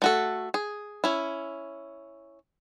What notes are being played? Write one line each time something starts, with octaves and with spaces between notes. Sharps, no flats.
A3 F#4 A4
G#4
C#4 E4